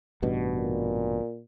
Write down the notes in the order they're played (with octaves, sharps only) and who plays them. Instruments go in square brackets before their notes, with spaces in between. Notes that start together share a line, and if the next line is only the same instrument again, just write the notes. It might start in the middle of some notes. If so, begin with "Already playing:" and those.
[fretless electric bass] A1 G2 B2
[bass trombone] A#2